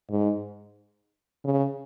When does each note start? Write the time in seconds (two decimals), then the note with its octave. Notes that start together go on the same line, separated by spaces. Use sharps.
0.10 G#2
1.45 C#3